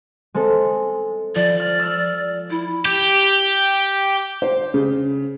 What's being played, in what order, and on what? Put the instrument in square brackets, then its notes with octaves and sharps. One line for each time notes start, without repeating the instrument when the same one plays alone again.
[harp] G#3 C4 A4
[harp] F3 [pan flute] D5
[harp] F6
E6 F6
[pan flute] E4 [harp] A6
[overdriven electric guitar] G4
[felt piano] C5
C#3